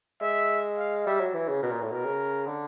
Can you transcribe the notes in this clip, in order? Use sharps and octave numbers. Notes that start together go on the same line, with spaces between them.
G#3 E5
F5
G3 E5
F#3
E3
C#3
B2 A#4
A#2
A2
B2 A#4
C#3
D3